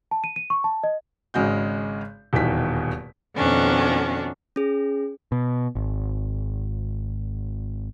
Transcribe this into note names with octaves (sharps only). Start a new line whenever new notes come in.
A5
D#7
D#7
C#6
A5
D#5
G#1 C#3 G#3 F#4 G6
D#1 E2 B2 D#3 B6
F2 B2 D#3 C#4 D4 F#4
C#4 G#4
B2
G#1